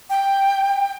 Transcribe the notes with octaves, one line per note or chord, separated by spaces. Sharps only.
G5